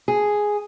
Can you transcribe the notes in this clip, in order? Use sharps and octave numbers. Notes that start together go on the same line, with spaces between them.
G#4